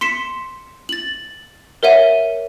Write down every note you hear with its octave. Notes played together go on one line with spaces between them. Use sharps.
C6 B6 C#7 E7
A6 F#7
A#4 C#5 E5 F#5 D#7